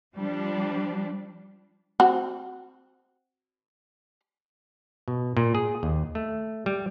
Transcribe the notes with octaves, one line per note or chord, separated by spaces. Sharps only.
F3 G3 D4
C4 F#4
B2
A#2
G#4
D#2
A3
G3